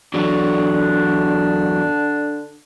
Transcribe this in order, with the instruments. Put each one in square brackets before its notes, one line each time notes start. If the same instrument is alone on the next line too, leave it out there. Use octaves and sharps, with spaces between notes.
[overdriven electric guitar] E2 F#3 [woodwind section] D3 D4